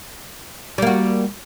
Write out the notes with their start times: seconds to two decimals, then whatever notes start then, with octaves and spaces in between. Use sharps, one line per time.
0.78 G3
0.82 A#3
0.87 F#4